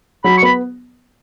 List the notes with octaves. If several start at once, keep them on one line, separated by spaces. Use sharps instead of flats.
F#3 B5
C#6
B3 B5